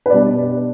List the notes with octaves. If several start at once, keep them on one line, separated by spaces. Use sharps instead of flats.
B4
B2 G3 D4 D5